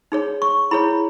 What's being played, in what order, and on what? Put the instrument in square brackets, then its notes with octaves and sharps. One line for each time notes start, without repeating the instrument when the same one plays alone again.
[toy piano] D#4 G#4 C#5
C#6
E4 G#4 C#5 B5